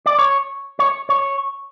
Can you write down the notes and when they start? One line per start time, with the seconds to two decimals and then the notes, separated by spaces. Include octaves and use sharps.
0.06 D5
0.19 C#5
0.79 C#5
1.09 C#5